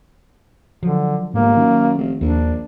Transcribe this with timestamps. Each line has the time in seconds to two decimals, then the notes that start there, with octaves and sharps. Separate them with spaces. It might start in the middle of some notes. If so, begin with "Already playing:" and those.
0.83 D3 F3 F#3
1.34 G1 G#2 A#3
1.57 F#2 D#3
1.98 F1
2.21 A#1 D#2 D4